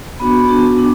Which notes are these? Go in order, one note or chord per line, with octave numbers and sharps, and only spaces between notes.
B3 D4 F#4 B5
B3 D4 F#4
B3 D4